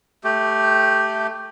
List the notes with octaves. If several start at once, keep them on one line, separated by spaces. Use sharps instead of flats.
A3 G4